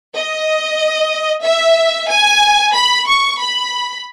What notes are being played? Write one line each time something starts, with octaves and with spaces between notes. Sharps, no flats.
D#5
E5
G#5
B5
C#6
B5